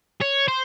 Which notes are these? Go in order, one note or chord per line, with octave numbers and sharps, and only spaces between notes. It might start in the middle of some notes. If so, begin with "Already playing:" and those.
C#5
C5